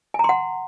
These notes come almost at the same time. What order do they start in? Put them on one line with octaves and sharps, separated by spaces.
G#5 A#5 C6 F#5